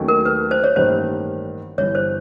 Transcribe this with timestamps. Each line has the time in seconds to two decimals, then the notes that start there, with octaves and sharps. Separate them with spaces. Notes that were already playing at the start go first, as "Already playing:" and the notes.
Already playing: D#2 D#3 F#3 A3 C#4
0.08 A#4
0.25 B4
0.51 C5
0.64 C#5
0.76 A1 G2 D#3 G3 A#3 C5
1.78 G1 G2 E3 C#5
1.95 C5